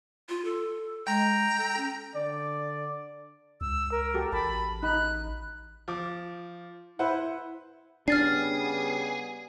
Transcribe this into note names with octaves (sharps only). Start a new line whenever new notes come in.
F4
A4
G#3 G5 A#5
A4
C#4
D3 D5
C#2 E6
A#4
F#4 G4 A4
A1 A5 B5
D#4 B5 F#6
F3 D6
E4 B4 C5 F#5
C#3 G3 B3 D4 G#4 F6 A6 C7